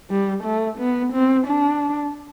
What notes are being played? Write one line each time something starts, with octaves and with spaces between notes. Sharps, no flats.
G3
A3
B3
C4
D4